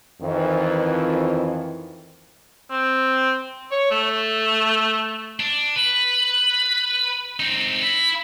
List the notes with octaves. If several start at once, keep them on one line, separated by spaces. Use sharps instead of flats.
F2 D#3 E3
C4
C#5
A3
D4
B4
C4 D#4
E4